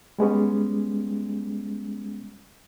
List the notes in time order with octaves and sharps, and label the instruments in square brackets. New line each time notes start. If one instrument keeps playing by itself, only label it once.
[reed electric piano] G3 G#3 B3 C#4